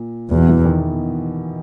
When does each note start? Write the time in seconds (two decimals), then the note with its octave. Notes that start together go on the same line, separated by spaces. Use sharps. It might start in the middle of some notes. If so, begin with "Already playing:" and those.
Already playing: A#2
0.30 E2 B2
0.49 E3
0.65 D#3